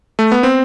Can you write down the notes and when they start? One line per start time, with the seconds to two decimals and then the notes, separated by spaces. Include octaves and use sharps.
0.19 A3
0.32 B3
0.43 C4